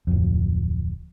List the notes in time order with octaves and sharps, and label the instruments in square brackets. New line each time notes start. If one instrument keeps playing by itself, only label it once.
[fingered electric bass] D1 F2